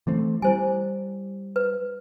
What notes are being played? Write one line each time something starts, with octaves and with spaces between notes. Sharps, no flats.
E3 A3 C4
G3 E4 C5 G#5
B4